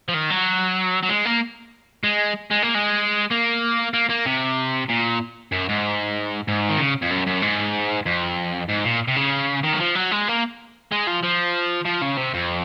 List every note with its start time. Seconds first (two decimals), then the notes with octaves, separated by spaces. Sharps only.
0.09 F3
0.14 D#3
0.30 F#3
1.03 F#3
1.09 G#3
1.25 A#3
2.04 G#3
2.51 G#3
2.63 A#3
2.75 G#3
3.31 A#3
3.94 A#3
4.10 A#3
4.26 C3
4.89 A#2
5.52 F#2
5.69 G#2
6.48 G#2
6.69 D#3
6.79 C#3
7.02 F2
7.10 F#2
7.26 F#2
7.42 G#2
8.06 F2
8.69 G#2
8.85 A#2
9.08 C3
9.16 C#3
9.64 D#3
9.73 F#3
9.80 F3
9.95 F#3
10.12 G#3
10.28 A#3
10.92 G#3
11.07 F3
11.23 F3
11.85 F3
12.02 C#3
12.17 C3
12.34 F2